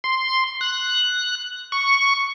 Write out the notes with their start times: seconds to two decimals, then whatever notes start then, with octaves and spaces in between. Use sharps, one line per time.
0.04 C6
0.61 F#6
1.72 C#6